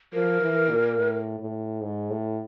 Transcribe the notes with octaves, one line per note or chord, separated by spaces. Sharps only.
F3 A#4
E3
A#2
A2
A2
G#2
A2